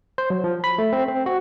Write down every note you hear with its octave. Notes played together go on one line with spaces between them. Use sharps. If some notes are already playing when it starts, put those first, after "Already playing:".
C5
F#3
F3
B5
A3
C4
C4
F#4